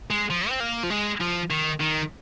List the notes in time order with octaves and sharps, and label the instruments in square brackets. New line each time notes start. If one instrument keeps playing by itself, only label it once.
[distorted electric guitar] G#3
F3
C4
A#3
F3
G#3
F3
D#3
D#3